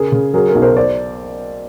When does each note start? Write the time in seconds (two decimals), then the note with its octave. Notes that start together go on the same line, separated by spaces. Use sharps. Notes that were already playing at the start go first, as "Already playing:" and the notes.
Already playing: C#3 G#4 A#4
0.12 C#3
0.34 F#3 G#4 A#4
0.48 G#4 A#4
0.55 B1
0.62 A#4 C5
0.77 C5 D5